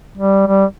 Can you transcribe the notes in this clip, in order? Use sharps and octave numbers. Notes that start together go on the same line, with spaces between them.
G3
G3